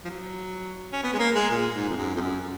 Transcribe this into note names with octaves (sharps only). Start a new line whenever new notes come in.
F3
F#3
C#4
B3
G#3
A#3
G#3
A#2
G#2
F2
F#2
F2
F#2